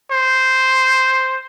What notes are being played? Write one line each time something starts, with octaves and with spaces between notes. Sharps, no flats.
C5